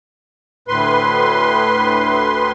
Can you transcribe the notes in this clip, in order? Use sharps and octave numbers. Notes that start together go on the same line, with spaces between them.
D2 A2 B4 C6